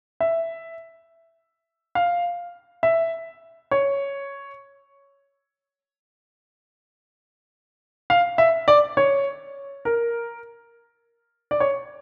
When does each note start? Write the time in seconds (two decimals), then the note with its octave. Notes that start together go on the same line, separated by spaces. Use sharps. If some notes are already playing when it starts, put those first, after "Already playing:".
0.20 E5
1.95 F5
2.83 E5
3.71 C#5
8.10 F5
8.38 E5
8.68 D5
8.97 C#5
9.85 A#4
11.51 D5
11.60 C#5